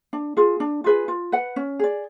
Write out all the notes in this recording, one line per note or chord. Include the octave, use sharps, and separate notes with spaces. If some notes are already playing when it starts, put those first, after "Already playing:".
D4
F4 G#4
D4
F4 G#4 B4
F4
B4 F#5
C#4
G#4 D5